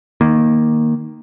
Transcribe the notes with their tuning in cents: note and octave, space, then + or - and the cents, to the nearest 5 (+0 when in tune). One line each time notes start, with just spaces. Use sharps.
D#3 +0 A#3 +0